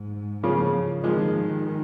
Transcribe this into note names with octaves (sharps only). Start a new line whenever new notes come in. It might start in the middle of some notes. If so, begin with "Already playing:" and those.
Already playing: G#2
C#3 F3
D#3 F3 G#3